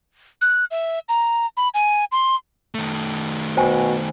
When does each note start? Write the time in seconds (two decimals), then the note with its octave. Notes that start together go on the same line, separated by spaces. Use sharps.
0.42 F#6
0.71 E5
1.09 A#5
1.57 B5
1.74 G#5
2.12 C6
2.75 D#3 A3
3.57 B2 C5 G5 G#5